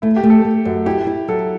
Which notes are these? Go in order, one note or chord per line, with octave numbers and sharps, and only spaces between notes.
A3 E4
G4
A3
A4
A3
F#2
E4 G4
E4
F#3 A4